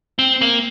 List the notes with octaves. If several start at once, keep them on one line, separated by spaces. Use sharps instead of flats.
C4
A#3